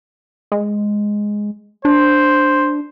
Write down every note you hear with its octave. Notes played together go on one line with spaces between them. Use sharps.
G#3
D4 C5